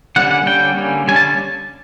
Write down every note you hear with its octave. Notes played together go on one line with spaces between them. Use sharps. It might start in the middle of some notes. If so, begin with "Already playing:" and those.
D3 G3 A#3 C#4 F#5
F#5
D3 G3 A#3 C#4 G5
D3 G3 A#3 C#4
D3 G3 A#3 C#4 G#5
A5